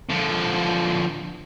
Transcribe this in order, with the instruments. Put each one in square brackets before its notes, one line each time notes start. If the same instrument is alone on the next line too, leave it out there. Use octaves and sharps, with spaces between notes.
[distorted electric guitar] D3 F3